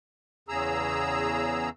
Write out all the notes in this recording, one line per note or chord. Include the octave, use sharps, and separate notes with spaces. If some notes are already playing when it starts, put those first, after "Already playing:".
E2 C#3 G#4 A#5 E6